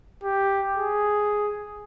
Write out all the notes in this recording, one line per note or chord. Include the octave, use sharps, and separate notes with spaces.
G4
G#4